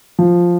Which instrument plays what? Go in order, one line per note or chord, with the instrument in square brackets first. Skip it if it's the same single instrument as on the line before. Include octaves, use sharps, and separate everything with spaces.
[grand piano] F3